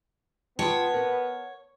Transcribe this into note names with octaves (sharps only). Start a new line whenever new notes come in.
B3 F4 C#5 G5 A5
A#4 F#5